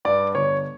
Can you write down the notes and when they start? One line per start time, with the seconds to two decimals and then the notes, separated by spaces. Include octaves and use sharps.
0.05 G2 D5
0.35 G1 C#5